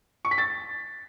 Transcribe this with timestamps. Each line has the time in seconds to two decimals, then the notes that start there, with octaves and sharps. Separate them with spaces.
0.25 C#6
0.31 B6
0.38 A6